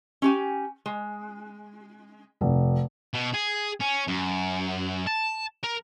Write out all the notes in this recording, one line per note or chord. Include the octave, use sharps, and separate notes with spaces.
C#4 G4 G#5
G#3
F1
B2
G#4
C#4
F#2
A5
A#4